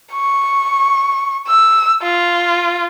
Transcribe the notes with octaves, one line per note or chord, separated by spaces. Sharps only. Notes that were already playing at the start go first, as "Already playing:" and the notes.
C#6
E6
F4